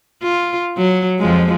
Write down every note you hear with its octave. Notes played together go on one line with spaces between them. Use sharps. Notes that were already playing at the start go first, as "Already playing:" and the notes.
F4
F#3
F2 F3 G#3